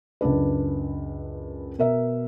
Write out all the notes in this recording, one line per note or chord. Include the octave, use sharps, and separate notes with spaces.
C#2 F#2 D4 B4
B2 A#4 E5